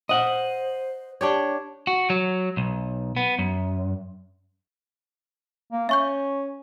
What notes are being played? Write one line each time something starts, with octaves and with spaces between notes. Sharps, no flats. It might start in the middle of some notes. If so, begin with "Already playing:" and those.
C5 D#5 F#5
D4 G4 C#5
F#4
F#3
B1
B3
F#2
A#3
C#4 E5 C#6 G6